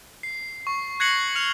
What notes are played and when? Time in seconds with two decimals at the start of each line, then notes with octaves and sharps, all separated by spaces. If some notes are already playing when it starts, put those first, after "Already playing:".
0.23 C7
0.67 C#6
1.00 F#6 G#6 A#6 C7 C#7 F#7
1.36 F6 C#7 F7